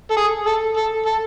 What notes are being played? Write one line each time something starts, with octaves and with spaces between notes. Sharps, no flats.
A4
G#4
A4
A4
A4